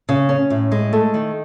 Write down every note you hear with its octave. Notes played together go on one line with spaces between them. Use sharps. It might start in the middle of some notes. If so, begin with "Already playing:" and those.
C#3
C#4
A2
G#3
A3
D#3